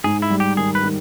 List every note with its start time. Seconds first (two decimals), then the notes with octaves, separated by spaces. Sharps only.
0.04 G#2 G#4
0.22 E4
0.30 G3
0.40 G4
0.57 D#3 G#4
0.75 B4
0.83 D#3